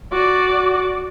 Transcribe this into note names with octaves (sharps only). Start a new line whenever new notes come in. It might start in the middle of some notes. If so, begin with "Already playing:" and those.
F#4 D5